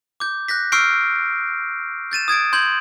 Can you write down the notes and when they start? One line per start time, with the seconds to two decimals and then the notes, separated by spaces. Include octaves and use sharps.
0.20 D6 G6
0.48 F#6 G6 A#6 B6
0.72 C#6 E6 F6 G6 C7 D7
2.11 G6 A6 D#7 E7
2.28 D#6 G#6 A6 D7
2.53 C6 G6 G#6 F#7